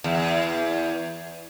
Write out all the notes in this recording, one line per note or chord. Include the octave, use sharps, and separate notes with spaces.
E2